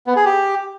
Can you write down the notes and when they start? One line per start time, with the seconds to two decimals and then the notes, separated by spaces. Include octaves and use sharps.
0.07 B3
0.16 G#4
0.25 G4